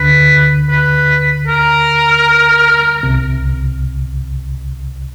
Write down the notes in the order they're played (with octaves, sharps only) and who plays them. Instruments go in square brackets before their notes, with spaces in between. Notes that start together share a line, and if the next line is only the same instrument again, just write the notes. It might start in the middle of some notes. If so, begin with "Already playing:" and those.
Already playing: [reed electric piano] D2 D3 [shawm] B4
[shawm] B4
A#4
[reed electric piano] C2 C3